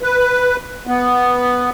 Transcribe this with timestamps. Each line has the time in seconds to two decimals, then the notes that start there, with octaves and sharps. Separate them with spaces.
0.02 B4
0.87 B3